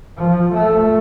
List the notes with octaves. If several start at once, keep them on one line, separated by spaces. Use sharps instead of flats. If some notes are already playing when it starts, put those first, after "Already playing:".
F3
A3